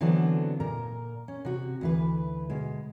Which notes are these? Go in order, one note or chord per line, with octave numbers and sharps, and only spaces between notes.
D3 E3 F#3 B3 C4 D4
A#2 A#4 A#5
C#4
C3 F#4
D2 E3 B4
B2 G#3